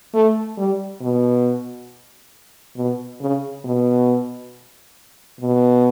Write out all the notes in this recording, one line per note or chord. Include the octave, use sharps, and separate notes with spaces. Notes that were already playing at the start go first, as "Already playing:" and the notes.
A3
G3
B2
B2
C#3
B2
B2